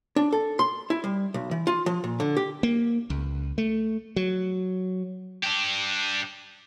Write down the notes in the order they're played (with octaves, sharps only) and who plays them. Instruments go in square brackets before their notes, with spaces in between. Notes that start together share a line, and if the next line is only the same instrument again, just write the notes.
[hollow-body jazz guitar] D4
A4
C6
E4
G3
B1
E3
F4
F3
A#2
D3
G4
[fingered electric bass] A#3
C#2
A3
F#3
[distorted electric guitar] D4 G4